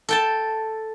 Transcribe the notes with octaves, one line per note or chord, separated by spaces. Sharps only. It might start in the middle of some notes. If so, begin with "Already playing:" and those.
A4 G5 A5